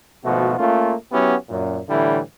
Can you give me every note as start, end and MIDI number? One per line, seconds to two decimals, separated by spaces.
0.25 0.58 32
0.25 0.58 47
0.25 0.58 53
0.25 0.58 57
0.25 0.58 66
0.58 0.94 57
0.58 0.94 58
0.58 0.94 61
0.58 0.94 65
1.11 1.35 54
1.11 1.35 59
1.11 1.35 61
1.11 1.35 64
1.11 1.35 67
1.49 1.79 42
1.49 1.79 46
1.89 2.18 45
1.89 2.18 50
1.89 2.18 52
1.89 2.18 55
1.89 2.18 64